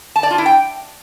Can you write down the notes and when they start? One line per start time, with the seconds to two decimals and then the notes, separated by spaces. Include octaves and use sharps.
0.16 A5
0.23 D5
0.31 F4
0.38 E4
0.46 G5